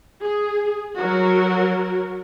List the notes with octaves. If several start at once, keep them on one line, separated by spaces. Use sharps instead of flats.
G#4
F#3 F#4 A#4